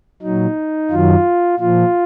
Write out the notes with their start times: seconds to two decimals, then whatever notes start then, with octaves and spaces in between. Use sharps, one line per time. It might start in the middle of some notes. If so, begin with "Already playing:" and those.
0.23 A#2 F#3 D#4
0.91 F#2 D#3 F#3 F4
1.59 A#2 F3 F4